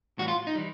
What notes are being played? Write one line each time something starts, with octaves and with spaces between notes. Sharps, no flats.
A2 E3 G3 F#4
F4
D#4
E3 G3